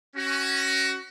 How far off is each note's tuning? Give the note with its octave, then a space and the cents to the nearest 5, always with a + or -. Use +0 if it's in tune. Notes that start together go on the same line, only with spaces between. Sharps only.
C#4 -5 F#4 +20